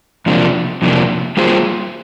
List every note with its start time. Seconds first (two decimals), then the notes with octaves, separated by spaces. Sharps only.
0.26 F2 C3 F3 A#3 D4
0.82 F2 C3 F3 A#3 D4
1.37 G3 A#3 F4 G#4 C5